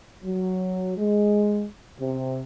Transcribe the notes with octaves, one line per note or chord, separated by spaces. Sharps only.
F#3
G#3
C3